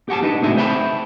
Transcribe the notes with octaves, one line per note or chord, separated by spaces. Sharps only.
G4 F#5 G#5 A5
D4 D#4 B4
C#2 A2 C4 F#4 G#4 E5
C5 E5 G5 A5 B5